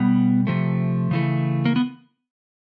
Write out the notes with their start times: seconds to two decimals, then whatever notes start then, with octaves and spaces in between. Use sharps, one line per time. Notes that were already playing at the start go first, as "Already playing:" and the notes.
Already playing: B2 G3 B3
0.47 C3 F3 A3
1.11 C#3 E3 A3
1.65 A#3
1.76 B3